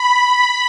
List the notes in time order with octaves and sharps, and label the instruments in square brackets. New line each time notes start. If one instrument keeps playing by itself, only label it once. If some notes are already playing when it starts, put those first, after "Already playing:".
Already playing: [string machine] B5